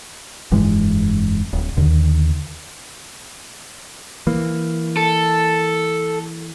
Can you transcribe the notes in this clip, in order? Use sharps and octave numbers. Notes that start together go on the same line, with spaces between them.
F1 G2 E3 G#3
D1
D#2 D3 D#3
E3 A#3
A4